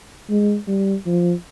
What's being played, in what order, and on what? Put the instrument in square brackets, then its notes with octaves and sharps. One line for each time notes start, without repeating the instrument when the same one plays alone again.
[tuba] G#3
G3
F3